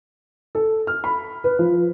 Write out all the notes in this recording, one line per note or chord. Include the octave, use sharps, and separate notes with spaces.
A4
F6
B5
B4
F3